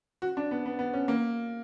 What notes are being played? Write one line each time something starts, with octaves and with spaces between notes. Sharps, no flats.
F#4
D4
B3
B3
B3
C#4
A#3